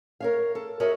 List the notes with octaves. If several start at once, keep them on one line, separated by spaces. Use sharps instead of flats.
A#4 C#5 F5
A4
F#4 A#4 C#5 D#5 E5